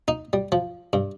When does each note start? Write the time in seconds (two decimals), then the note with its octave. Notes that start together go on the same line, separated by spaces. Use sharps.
0.08 D#4
0.33 G3
0.52 F3
0.93 G2